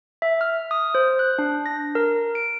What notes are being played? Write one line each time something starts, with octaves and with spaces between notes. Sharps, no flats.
E5
F6
D#6
C5
F#6
D4
A#6
A#4
D7